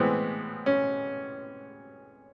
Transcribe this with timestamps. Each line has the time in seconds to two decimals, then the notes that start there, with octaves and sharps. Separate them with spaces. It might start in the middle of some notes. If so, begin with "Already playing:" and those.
Already playing: A2 E3 G#3 B3 C4
0.66 C#4